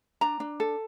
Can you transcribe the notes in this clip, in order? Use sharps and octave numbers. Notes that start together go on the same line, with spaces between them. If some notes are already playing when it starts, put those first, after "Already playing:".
D4 A#5
D4
A4